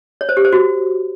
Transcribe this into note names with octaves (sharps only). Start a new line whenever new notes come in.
C#5
C5
G4
C5
F#4